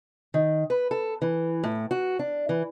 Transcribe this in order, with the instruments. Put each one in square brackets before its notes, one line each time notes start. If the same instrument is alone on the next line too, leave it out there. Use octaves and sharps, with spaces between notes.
[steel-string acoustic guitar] D#3
B4
A4
E3
A2
F#4
D4
E3